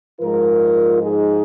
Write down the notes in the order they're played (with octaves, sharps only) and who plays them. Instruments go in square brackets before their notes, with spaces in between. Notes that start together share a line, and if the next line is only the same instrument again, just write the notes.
[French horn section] G#2 F3 G#3 F4 A#4
D#4 G#4